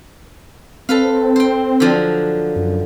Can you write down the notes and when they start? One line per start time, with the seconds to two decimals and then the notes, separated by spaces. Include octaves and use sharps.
0.89 C4 A4 B4 F5
1.36 C5 G5
1.80 D3 F3 F#3
2.56 F#2